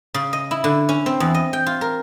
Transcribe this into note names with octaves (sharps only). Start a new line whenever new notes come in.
C#3
D#5
E4
D3
C#4
C4
E2
D#5
G5
F4
A#4